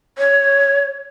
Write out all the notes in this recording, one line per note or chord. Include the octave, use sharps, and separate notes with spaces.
C#5